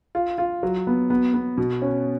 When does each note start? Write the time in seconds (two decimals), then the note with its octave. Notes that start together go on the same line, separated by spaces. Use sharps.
0.15 F4
0.38 F4
0.63 F#3
0.87 B3
1.10 B3
1.34 B3
1.58 B2
1.82 C#4